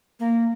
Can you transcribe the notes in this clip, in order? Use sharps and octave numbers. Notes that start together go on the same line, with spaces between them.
A#3